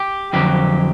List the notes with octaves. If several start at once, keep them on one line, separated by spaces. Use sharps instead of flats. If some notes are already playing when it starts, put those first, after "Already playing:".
Already playing: G4
F2 D3 F#3 G4